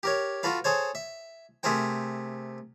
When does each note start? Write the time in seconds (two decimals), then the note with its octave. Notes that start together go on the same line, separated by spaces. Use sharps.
0.03 G4 A#4 C#5
0.43 F4 F#4 A4 B4 F5
0.64 G#4 A4 C5 C#5
0.95 E5
1.63 C3 A3 G#4 A#4 C5 G5